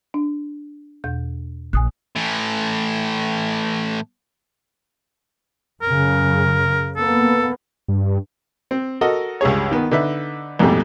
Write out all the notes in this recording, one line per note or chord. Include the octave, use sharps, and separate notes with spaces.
D4
E2 B2 G6
A#1 G#5 D#6 F#6
A2 E3
F#2 C#3 A#4
A#3 B3 A4
G2
C4
F#4 A4 A#4 D#5
C#2 G2 G#4 C#5
D#3 B3
D3 D#4 B4 E5
A#1 F2 G#2 B2 G3 A3